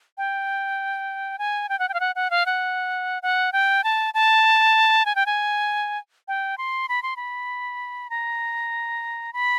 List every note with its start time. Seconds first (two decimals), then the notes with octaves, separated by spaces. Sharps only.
0.18 G5
1.39 G#5
1.69 G5
1.79 F#5
1.89 G5
1.94 F5
2.00 F#5
2.15 F#5
2.30 F5
2.46 F#5
3.23 F#5
3.53 G5
3.84 A5
4.14 A5
5.06 G#5
5.15 G5
5.26 G#5
6.28 G5
6.58 C6
6.89 B5
7.03 C6
7.16 B5
8.10 A#5
9.33 B5